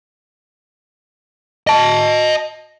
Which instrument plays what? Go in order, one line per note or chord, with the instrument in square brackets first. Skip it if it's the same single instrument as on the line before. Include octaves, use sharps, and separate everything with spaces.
[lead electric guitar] D#5 A5